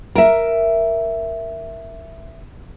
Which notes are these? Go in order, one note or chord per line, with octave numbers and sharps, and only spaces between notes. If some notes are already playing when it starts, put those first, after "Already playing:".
A#4 E5